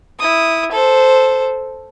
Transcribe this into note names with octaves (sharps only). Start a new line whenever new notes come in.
E4 D#6
A4 C5